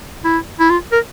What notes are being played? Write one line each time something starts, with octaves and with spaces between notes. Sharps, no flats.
E4
E4
F4
A#4